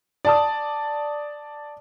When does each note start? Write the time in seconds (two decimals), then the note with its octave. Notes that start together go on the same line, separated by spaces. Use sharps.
0.25 D5 A5 D#6